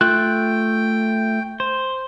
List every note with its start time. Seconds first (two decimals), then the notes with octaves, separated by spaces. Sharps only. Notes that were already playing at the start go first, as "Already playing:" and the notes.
0.01 A3 F4 G5 F#6
1.60 C5